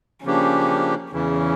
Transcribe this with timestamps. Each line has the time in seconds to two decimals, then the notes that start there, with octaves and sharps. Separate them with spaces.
0.24 C#3 F3 A#3 C#4 D4 G4
1.13 E2 C#3 E3 C#4